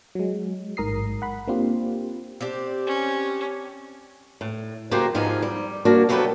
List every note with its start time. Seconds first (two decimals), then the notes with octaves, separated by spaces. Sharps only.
0.15 F#3 G#3
0.77 A1 G#2 A#4 A#5 D#6 C7
1.22 F#5 B5
1.47 A#3 C4 D4 F4 G4
2.41 C4 D4 G4
2.86 C#4
4.41 A2
4.91 C#3 F#3 A#3 D4 G4 C5
5.15 G#2 F3 B3 D#4 F4 G#5
5.42 G3
5.85 G3 A#3 D4 F#4
6.09 F#3 A3 B3 G4 A4 B4